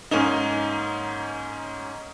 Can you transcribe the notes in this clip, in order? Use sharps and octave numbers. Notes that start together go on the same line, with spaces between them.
G#2 A#3 C#4 D#4